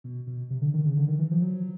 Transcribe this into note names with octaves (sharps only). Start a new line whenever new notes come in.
B2
B2
C3
D3
D#3
C#3
D3
D#3
E3
F3
F#3